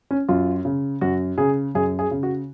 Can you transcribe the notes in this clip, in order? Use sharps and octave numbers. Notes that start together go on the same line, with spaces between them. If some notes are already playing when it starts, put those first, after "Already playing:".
C#4
F#2 F4
C#3
F#2 F#4
C#3 G#4
F#2 G#4
G#4
C#3
F#4